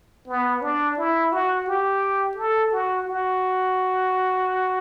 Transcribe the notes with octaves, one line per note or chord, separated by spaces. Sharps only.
B3
D4
E4
F#4
G4
A4
F#4
F#4